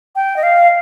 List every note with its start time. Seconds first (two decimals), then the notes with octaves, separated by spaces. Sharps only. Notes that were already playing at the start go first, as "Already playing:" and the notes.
0.16 G5
0.36 D#5
0.43 F5